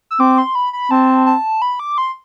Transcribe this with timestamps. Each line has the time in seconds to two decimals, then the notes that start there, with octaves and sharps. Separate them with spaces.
0.11 E6
0.20 C4 D6
0.38 C6
0.55 B5
0.73 B5
0.91 C4 A5
1.26 A5
1.62 B5
1.80 D6
1.98 C6